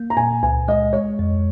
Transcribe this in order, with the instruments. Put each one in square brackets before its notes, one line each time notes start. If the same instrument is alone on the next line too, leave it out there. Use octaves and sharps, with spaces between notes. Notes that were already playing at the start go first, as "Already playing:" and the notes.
Already playing: [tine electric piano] A#3
[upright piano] A#5
[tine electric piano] A#2 [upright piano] G#5
[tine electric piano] C#2 [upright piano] G#5
[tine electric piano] G#3 [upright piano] D#5
[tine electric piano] G#3 [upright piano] C#5
[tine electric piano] F2